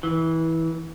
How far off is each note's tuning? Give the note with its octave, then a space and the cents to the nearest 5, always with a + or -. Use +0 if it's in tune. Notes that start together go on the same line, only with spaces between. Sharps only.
E3 -20